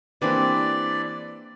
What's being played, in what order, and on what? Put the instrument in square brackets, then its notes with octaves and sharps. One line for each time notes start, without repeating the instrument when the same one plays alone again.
[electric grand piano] E3 D4 B4 [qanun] A#3 C4 G4 [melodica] D5